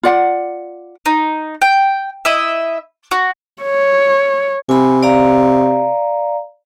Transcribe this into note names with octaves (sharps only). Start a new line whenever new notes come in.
F4 D5 F#5
D#4
G5
E4 D#5 E5
F#4
C#5
C3 G#5 B5
D5 F5 A#5